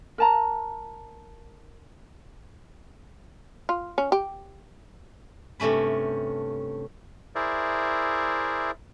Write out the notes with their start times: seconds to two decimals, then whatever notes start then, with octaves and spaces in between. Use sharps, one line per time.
0.18 A#4 A5 A#5
3.69 F4
3.98 C#4
4.12 G4
5.60 G2 C3 A3 C#4 B5
7.35 E4 G#4 A#4 C5 D5 E5